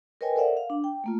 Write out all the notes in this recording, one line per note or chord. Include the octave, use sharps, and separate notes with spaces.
A#4 B4 C#5 D#5 G5 G#5
A4 A#4 C5 D5 E5 F#5
F5
D4
G5
A3 A#3 F4